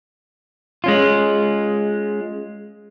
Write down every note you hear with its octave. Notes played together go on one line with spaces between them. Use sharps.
G#3 C#4 F4